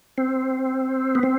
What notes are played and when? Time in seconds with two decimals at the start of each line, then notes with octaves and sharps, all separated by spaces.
0.18 C4
1.15 B3
1.23 C4